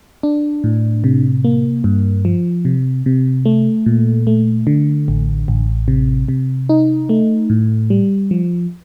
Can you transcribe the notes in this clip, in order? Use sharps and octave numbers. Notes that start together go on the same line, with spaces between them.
D4
A2
C3
A#3
G2
F3
C3
C3
A3
A#2
A3
D3
A1
A1
C3
C3
D#4
A3
A2
G3
F3